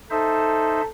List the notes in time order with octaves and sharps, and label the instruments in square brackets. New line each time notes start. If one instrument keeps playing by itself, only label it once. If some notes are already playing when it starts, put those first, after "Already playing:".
[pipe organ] D#4 C5 E5 [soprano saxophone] A4